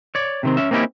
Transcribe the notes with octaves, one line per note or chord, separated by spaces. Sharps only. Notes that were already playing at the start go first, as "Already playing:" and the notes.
C#5 D5
C3 D#3 C4
C#4 E5
A#3 C4 C#4 D#4 E4 G4